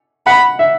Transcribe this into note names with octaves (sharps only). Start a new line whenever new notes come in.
F#5 B5
E5